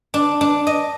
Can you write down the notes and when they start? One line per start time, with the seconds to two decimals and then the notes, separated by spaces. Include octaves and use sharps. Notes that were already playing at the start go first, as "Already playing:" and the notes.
0.14 D4
0.41 D4
0.67 D#5